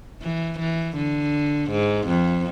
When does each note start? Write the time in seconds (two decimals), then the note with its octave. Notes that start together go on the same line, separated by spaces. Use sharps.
0.22 E3
0.59 E3
0.96 D3
1.70 G#2
2.08 F2